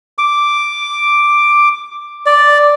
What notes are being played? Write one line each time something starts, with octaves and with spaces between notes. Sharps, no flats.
D6
D5